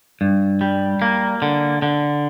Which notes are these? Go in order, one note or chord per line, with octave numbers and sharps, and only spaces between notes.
G2
G3
A#3
D3
D3